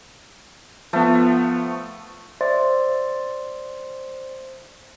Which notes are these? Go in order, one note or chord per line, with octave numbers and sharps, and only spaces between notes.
F3 A3 B3
C5 D5 E5 C6 A6